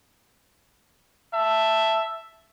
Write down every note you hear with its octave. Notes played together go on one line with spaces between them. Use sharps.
E5 A5